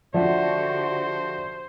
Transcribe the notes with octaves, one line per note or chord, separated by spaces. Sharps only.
D3 F3 F#4 G4 C5 D5 E5 F#5